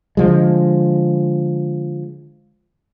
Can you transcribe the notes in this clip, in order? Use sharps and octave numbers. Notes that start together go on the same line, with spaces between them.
D3 E3 F3 G#3